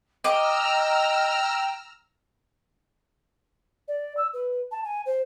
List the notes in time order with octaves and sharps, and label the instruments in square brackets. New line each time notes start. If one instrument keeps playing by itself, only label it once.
[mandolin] D#5 D6 [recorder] G5 [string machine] A#5 E6 F6
[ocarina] D5
E6
B4
A5
G#5
C5